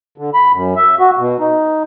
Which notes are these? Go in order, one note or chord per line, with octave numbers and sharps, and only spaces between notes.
D3
B5
F#2
E5
F#4
B2
D#4